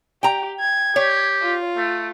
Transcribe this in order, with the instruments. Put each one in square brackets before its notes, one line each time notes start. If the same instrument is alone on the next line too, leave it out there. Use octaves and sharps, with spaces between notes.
[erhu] G4 [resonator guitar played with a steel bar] G5 A#5
[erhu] G#6
[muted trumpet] G4 [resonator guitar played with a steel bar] C#5
[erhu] F4
[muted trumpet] A3